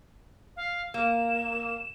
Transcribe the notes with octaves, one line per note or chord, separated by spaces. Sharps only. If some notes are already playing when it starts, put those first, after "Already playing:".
F5
A#3 E7